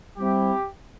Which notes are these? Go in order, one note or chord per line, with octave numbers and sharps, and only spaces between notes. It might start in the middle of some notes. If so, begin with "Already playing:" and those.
G3 C4 E4 G4